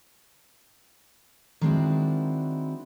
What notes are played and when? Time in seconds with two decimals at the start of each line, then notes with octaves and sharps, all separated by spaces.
1.61 D#3 G#3 C4 D4 E4 F#4